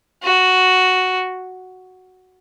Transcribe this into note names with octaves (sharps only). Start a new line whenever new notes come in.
F#4